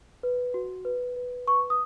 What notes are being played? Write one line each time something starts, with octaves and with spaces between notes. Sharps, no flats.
B4
F#4
B4
B4
B4 C#6
D#6